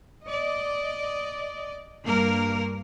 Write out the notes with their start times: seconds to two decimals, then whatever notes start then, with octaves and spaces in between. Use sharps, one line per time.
0.24 D5 D#5
2.05 G2 A#3 A#4